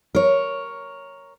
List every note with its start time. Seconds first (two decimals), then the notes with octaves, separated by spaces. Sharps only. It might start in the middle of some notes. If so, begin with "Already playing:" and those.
0.15 A#4 C#5